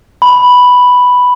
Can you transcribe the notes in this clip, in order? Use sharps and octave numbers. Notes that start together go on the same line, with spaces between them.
B5